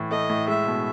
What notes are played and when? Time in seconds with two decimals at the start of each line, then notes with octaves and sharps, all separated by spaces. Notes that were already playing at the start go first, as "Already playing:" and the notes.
Already playing: A2 E3
0.11 A3 D#5
0.29 A2
0.48 G#3 E5
0.67 B2